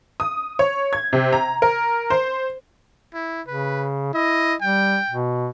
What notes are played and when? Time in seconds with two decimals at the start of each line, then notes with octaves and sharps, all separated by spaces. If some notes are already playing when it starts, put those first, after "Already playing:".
0.20 D#6
0.59 C#5
0.93 G#6
1.13 C3
1.33 A#5
1.62 A#4
2.10 C5
3.14 E4
3.47 C#3 B4
4.14 E4 D#5
4.61 G3 G5
5.10 B2